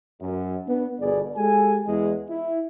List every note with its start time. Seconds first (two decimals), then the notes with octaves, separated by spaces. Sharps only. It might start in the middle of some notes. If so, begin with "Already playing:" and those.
0.21 F#2
0.67 B3 D4
1.00 G1 B2 G#4 D5
1.36 G#3 G4 A4 G#5
1.87 E2 G#3
2.29 E4